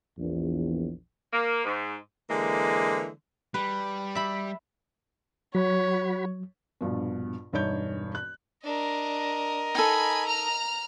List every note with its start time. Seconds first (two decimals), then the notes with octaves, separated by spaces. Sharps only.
0.18 A#1 E2
1.33 A#3
1.64 G#2
2.29 D3 E3 G#3 A#3
3.54 G3 B4
4.15 E5 B5
5.55 F#3 F#4 C#5 B5
6.81 A#1 G2 B2
7.53 E1 G2 D#4 C#5 G6
8.15 F#6
8.64 D4 A#4 D#5
9.75 D#4 A4 G#5 B5
10.27 A#5 F6